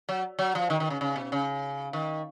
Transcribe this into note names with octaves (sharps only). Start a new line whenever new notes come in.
F#3
F#3
F3
D#3
D#3
C#3
C#3
B2
C#3
D#3